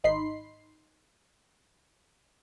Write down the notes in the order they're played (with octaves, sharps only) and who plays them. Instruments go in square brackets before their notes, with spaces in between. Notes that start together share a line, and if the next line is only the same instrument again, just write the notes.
[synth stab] G#1 D#4 B5 C6 C7